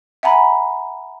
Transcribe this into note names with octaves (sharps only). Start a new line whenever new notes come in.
E5 F#5 G#5 A#5 B5